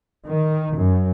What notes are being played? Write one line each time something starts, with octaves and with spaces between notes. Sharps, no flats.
D#3
F#2